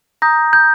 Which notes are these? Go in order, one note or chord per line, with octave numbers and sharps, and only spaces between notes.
A#5 D#6 G6 A#6
G6